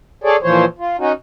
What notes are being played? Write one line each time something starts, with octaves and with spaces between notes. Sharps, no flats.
G#4 A4 C#5 D5
A#2 E3 F3 C5 C#5
F4
C#4 D#4 F#4